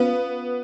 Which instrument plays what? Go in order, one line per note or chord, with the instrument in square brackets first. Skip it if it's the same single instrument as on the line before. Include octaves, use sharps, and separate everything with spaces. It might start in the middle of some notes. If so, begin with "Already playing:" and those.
Already playing: [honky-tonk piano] B3 [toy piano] C#4 F4 B4 F5